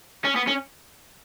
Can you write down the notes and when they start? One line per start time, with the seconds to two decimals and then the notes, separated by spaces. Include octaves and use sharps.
0.25 C#4
0.36 B3
0.48 C#4